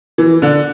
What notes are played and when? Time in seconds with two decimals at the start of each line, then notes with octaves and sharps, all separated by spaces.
0.18 E3
0.42 D3